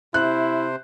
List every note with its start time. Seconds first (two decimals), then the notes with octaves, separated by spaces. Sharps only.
0.14 C3 E4 C5 F#6